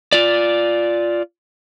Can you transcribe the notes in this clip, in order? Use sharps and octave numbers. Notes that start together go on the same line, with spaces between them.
F4 D5